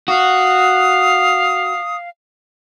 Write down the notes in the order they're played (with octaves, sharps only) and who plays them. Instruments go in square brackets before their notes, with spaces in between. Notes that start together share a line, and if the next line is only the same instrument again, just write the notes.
[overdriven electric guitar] F#4 [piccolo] F5 [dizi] D#6